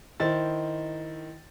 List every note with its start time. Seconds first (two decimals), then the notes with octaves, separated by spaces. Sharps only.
0.20 D#3 E4 C5 A6